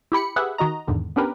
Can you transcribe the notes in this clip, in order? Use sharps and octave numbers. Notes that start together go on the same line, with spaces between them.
E4 G4 B5 C#7
G4 G#4 B4 E5 F#5
D#3 F#4 D#5 A#5
E2 G#2 D3 D#3
B3 C#4 D4 G4 A#4 B4